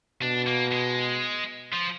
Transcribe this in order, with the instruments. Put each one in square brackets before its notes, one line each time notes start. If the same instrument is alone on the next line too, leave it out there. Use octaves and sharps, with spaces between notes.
[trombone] B2 [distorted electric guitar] D4
[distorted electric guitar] A#3
G#3
F3